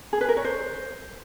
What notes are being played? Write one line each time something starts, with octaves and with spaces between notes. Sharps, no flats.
G#4
B4
A#4
C#5
C5